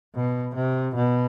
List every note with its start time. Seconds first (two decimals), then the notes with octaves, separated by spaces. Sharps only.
0.15 B2
0.55 C3
0.96 B2